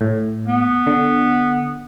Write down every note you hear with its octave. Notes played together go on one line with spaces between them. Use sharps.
A2
B3
D3